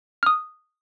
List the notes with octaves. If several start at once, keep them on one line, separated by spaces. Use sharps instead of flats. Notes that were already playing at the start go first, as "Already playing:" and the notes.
D#6 F6